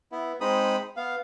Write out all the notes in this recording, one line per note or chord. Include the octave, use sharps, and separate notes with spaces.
B3 E4
G#3 C4 D#4 B5 D#6
B3 F5